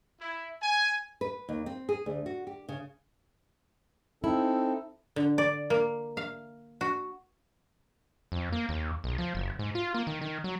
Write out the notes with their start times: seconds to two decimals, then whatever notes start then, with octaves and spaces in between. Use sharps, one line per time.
0.21 E4
0.63 G#5
1.21 B4
1.49 D#2
1.66 C4
1.89 G#4
2.06 D2
2.26 F#4
2.47 G4
2.69 C#3
4.24 C4 D#4 E4 A4
5.16 D3
5.38 D5
5.70 A#3
6.17 F5
6.81 F#4
8.32 F2
8.52 A#3
8.69 D#2
9.04 B1
9.18 F3
9.35 F#1
9.59 G#2
9.75 F4
9.94 A#3
10.07 D#3
10.22 D#3
10.44 F#3